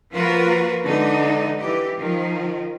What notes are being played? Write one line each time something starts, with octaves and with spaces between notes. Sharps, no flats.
F3 A#3 F4 F#4 A#4 B4
D3 E3 G#3 D#4
E3 G4
D#3 F3